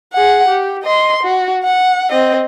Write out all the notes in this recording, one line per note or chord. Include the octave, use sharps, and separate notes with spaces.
G#4 F#5
G4
D#5 C6
F#4
F#5
C4 D#5